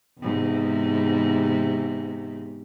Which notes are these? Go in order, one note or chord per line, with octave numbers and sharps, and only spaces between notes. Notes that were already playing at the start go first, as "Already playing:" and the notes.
E2 G#2 C3